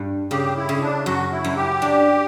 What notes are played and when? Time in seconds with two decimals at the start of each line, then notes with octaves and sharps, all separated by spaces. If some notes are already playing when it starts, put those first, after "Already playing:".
Already playing: G2
0.31 C#3 G4
0.57 E4
0.69 C#3
0.82 D4
1.06 F#2 F#4
1.32 E4
1.44 F#2
1.56 G4
1.82 D4